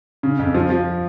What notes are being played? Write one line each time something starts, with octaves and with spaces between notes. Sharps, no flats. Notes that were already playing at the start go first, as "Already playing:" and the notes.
C#3
F2
F3
F3